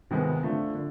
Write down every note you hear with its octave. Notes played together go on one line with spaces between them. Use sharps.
C#2 C3 D#3 G#3 B3
D3 F3 A3
D3